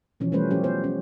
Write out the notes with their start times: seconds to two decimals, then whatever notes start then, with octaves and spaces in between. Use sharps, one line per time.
0.20 B2 E3 F3 C#4
0.32 E3 G3 A3 C#4 B4 C5
0.50 F3 F#3 C#4 G4
0.63 B3 C5
0.84 C#4